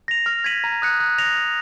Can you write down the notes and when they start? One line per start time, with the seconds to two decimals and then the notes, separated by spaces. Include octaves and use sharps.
0.08 A#6 F7
0.26 F6
0.44 G#6 B6 D#7 F#7
0.64 A#5
0.82 D#6 F#6 C#7
1.00 F#6
1.18 A#6 F7
1.36 F6